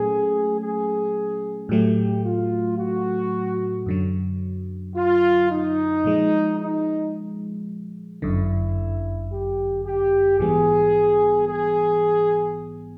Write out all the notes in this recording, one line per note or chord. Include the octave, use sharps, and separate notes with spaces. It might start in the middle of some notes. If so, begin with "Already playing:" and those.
Already playing: A#2 F#3 A3 C#4 G#4
G#4
A2 F#3 A3 G4
F4
F#4
F#2 D3 F#3
F4
D#4
A#2 F3 G#3
D#4
G1 F#2 D3 E4
G4
G4
A#1 G#2 E3 G3 B3 G#4
G#4